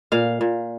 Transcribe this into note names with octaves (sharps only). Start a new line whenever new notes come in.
A#2 F5
A#2